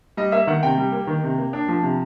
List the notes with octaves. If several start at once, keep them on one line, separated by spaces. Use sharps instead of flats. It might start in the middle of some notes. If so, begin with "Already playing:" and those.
G3 D#5
A#3 E5
D#3 F#5
C3 G5
G3
A#3
D#3
C3
A#3
D4
F3
C3